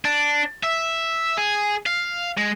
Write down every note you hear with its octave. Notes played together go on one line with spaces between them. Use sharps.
D4
E5
G#4
F5
G#3